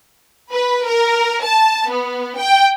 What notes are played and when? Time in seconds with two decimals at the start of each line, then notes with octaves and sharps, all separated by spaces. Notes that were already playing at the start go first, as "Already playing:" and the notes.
0.52 B4
0.87 A#4
1.42 A5
1.91 B3
2.38 G5